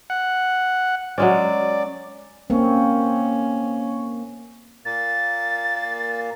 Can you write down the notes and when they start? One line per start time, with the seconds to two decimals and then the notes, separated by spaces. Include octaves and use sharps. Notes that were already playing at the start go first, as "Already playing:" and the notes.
0.10 F#5
1.18 F#3 G#3 C#4 D5
2.50 A#3 C4 C#4
4.85 A#2 A#3 A6